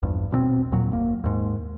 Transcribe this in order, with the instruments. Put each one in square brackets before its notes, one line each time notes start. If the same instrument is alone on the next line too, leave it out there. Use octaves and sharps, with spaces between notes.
[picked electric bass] A#1 E2 G2
D#1 B2 A#3 C4
D#2 A#2 F#3
F#1 A#3
D#2 G#2